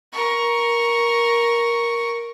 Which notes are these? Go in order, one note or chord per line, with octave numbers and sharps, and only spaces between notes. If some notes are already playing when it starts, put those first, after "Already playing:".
A#4 C#6